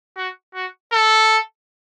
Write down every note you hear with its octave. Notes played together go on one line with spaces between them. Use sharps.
F#4
F#4
A4